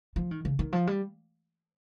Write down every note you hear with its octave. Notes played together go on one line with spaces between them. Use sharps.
F3
D#3
C#3
D#3
F3
G3